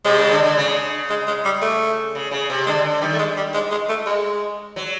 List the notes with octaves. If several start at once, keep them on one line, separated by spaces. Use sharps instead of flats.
C3 G#3
C#3
D3
D3
C#3
G#3
G#3
G3
A3
C#3
C#3
C3
D3 G#3
D3
D#3 G3
A3
G#3
G3
G#3
G#3
A3
G#3
F#3